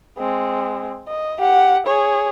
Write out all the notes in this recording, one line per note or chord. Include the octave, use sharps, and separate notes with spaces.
G#3 C4
D#5
G4 F#5
G#4 C#5